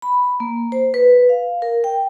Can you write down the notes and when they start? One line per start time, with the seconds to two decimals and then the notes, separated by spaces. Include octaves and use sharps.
0.02 B5
0.40 A#3
0.72 C5
0.94 B4
1.29 F5
1.62 A#4
1.84 G5